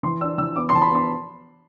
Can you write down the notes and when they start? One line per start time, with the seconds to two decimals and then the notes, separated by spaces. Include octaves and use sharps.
0.03 E3 C6
0.20 D4 E6
0.38 E3 E6
0.56 B3 D6
0.69 C6
0.73 E3 A5
0.82 B5
0.91 B3 C6